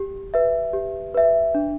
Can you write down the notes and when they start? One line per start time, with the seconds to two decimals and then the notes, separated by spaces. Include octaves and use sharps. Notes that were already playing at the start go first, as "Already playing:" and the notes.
Already playing: G4
0.34 B4 E5
0.73 G4
1.14 B4 E5
1.55 D4